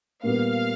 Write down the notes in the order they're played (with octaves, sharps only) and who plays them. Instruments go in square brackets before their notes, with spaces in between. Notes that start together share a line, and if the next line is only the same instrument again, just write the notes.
[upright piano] A#2 G3 B3 [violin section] F5